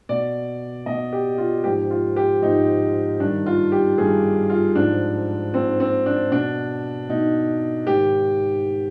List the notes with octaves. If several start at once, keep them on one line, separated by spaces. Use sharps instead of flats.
B2 D5
B2 D#5
G4
F4
G#2 F3 G4
F4
G4
G#2 F3 D#4
G2 D#3 D4
F4
G4
G2 D#3 G#4
F4
G#2 F3 D4
G#2 F3 C4
C4
D4
B2 D4
B2 D#4
G#2 D#3 G4